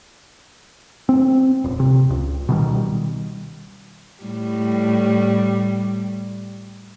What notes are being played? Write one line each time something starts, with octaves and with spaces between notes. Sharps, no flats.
C4
D#1
C3
C#2
B2 D#3 G3
A2 G3